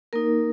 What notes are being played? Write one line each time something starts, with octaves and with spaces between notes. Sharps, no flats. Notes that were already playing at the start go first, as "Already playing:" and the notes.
A#3 D#4 A#4